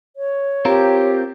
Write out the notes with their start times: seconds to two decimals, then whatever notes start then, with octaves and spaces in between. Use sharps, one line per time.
0.16 C#5
0.65 C4 F4 G4 A#4